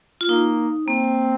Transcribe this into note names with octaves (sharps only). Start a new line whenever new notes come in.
F4
A#3 D#4
A#3 C4